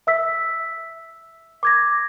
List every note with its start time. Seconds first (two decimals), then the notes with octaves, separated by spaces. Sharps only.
0.07 E5 E6 B6
1.63 D6 G#6 A#6